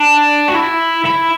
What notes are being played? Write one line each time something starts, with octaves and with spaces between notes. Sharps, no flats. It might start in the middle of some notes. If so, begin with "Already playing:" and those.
Already playing: D4
F#4
E4
E4